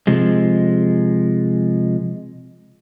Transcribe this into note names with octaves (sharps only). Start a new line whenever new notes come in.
C3 F3 G#3